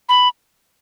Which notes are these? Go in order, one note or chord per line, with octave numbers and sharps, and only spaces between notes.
B5